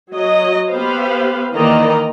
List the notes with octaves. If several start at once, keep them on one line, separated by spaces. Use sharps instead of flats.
F#3 D#5
B3 G4 B4 C5 F5
D#3 E3 A#3 D5 D#5 A#5